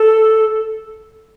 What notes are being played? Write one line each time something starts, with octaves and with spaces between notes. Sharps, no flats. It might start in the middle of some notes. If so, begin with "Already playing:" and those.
Already playing: A4